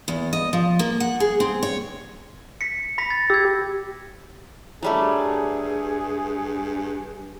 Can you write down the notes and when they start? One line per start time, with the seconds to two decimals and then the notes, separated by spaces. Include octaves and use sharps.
0.08 E2
0.33 D#5
0.53 F3
0.79 A#3
1.00 F#5
1.20 G#4
1.40 C4
1.63 C#5
2.61 B6 C#7
2.98 B5 A#6 B6
3.10 A6
3.30 G4 E6 G#6
4.83 G2 F#3 G3 A3 G#4